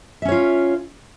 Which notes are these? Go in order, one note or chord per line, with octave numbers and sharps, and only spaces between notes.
C#4 F4 C#5 E5